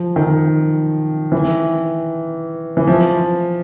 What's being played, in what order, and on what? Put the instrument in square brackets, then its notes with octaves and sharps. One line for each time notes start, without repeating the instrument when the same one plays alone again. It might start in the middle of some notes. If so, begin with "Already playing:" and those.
Already playing: [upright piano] F3
D#3
E3
E3
F3